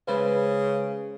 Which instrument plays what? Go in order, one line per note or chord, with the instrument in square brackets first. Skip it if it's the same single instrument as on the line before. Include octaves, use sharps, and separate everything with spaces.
[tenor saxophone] C#3 [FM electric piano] G#3 B4 C5